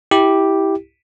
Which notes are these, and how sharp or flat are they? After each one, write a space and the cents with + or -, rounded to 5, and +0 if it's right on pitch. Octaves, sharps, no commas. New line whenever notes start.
E4 -15 G4 +0